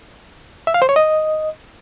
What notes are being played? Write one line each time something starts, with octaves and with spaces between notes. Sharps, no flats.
E5
F5
C5
C#5
D#5